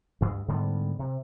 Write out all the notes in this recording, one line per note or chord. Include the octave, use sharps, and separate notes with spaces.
D2 G2
G#2 D3 G3 B3
C3